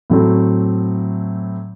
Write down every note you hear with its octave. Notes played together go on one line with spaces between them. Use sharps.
A2 F#3 A3 C4